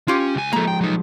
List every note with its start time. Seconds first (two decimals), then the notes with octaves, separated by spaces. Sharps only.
0.08 C#4 F4 G4
0.35 C#2 G#5
0.53 F3 G#3 A#3 A4 A#5
0.68 G5
0.81 F#3 D#4